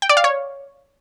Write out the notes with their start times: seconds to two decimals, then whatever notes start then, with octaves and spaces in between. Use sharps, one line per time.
0.02 G5
0.09 D5
0.17 F5
0.24 C#5